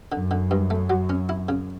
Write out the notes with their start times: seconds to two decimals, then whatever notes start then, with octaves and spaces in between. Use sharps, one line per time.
0.12 F#2 D3
0.31 D3
0.51 G2
0.70 A3
0.90 F#3
1.09 C#4
1.29 E4
1.49 C#3